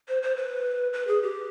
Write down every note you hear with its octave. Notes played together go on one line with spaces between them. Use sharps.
C5
C5
B4
B4
G#4
G4